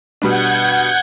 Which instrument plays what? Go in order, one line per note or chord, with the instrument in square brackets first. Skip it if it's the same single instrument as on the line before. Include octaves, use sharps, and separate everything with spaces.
[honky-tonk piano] B2 G3 D4 [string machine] F#5 G6 G#6